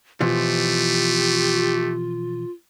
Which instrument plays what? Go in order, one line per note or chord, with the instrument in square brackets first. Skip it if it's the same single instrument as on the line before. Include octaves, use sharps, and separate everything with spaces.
[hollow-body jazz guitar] B2 E3 F3 [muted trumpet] A3 [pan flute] F4 [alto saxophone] G4